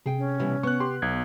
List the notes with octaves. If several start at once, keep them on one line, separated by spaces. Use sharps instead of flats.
C3 G#4 G5
C#4
B2 E3 G3
B3 C#6 F#6
G4 C6
B1 G#6